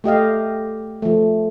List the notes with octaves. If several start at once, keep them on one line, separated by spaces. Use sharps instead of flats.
A3 G4 D#5 F5
F3 A3